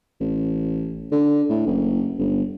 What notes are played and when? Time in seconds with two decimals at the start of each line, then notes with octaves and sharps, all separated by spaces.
0.21 A1
1.12 D3
1.49 A2
1.67 F#1
2.19 G1